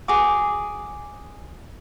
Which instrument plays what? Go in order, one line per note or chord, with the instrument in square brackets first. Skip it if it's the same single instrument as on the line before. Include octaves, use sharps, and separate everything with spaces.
[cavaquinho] F#4 G#4 [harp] D6